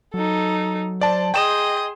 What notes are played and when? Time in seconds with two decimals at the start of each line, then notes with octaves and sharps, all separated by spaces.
0.14 F#3 D#4 A4
1.01 C5 D5 A5
1.34 G#4 D#5 G5 C6 E7